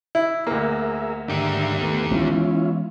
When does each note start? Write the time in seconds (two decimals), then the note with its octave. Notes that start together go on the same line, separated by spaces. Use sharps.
0.15 E4
0.47 D2 A#3 G#4 A#4 E5
1.29 G#2 D3 D#3 G4 E5
1.81 D#2 A3 B3
2.11 E3 G#3 B3 C#4 E4 F4